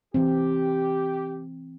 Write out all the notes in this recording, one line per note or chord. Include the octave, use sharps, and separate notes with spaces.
E3 C4 G4